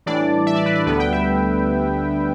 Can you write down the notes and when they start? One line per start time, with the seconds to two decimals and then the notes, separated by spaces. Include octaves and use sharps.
0.06 A2 E3 G3 D4 D5
0.47 E5
0.56 D5
0.66 B4
0.75 D5
0.86 D2 D3 G3 B3 B4
1.00 G5
1.12 E5